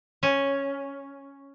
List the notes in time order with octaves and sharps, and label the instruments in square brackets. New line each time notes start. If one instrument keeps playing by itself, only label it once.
[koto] C#4